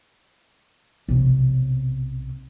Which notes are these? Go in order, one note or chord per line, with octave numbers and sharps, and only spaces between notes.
B1 C3